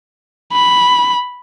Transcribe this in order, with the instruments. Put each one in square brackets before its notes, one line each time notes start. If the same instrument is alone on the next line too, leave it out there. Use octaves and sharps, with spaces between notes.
[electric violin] B5